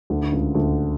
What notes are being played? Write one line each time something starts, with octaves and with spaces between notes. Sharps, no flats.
D2 D3
D3
C#2 C#3
D2 D3